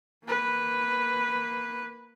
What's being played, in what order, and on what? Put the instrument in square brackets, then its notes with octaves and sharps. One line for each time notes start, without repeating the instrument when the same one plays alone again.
[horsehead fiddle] A#3 B4